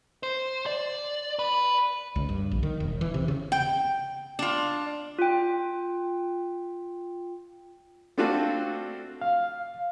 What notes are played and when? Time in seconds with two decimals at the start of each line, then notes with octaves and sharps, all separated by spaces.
0.23 C5
0.66 D5
1.39 B4
2.16 C#2
2.29 G2
2.51 A#1
2.63 D#3
2.80 E1
3.01 E3
3.14 C3
3.28 C#3
3.52 G5
4.39 D4 F4
5.19 F4 G5
8.18 A3 C4 D4 F4 F#4 A4
9.22 F5